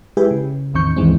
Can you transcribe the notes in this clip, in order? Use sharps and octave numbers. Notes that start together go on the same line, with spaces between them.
G#3 E4 G4 G#4 B4
C#3
A1 E2 D#3 C4 C#6 G6
D2 G2 D#3 E3 G#3 C4